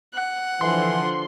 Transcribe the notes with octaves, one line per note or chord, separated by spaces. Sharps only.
F#5
D3 E3 F3 C6